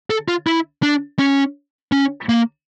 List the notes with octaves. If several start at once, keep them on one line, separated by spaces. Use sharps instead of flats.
A4
F4
E4
D4
C#4
C#4
A#3